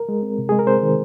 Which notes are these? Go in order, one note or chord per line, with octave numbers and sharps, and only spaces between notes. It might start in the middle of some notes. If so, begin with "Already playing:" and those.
Already playing: A#4
G#3
C4
C3
G#3 G#4
A#4
C4 C5
D#3